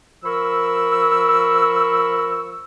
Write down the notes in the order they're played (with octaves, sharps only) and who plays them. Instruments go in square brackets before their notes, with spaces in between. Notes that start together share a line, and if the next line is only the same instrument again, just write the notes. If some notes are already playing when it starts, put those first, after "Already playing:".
[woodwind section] F3 A#4 B5 C#6 E6